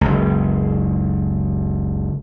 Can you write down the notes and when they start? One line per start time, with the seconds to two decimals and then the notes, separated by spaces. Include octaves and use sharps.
0.01 F#1 C#2